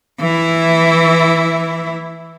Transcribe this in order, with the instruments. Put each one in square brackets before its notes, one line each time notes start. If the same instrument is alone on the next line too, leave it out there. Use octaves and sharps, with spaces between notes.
[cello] E3 E4